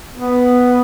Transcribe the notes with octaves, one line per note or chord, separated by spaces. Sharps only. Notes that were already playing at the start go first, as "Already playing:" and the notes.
B3